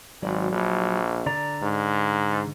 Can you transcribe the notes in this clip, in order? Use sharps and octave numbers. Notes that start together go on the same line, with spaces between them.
G#1 F#3 D5
A#1
D3 D5 A#5
G#2